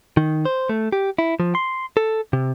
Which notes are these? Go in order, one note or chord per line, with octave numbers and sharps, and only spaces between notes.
D#3
C5
A3
G4
E4
F3
C6
A4
C3